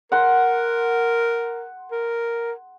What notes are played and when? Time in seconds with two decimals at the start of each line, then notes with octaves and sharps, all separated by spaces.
0.12 A#4 F#5 C6
1.91 A#4